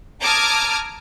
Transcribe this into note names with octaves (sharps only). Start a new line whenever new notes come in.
A5 A#5 D6 D#6 F6 G#6